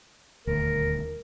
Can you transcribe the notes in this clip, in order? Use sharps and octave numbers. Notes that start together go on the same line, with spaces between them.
D#1 D2 A#4